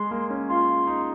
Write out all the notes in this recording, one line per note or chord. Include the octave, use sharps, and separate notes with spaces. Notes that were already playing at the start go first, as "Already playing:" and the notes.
Already playing: G#3 C6
A#3
C#4
F4 C6
D#4